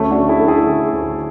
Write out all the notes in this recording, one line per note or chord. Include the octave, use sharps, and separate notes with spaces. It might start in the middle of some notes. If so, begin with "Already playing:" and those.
Already playing: D2 A3 C#4
D4 F#4
D2
E4 G#4
D2 A4
E4 G#4
D3
D2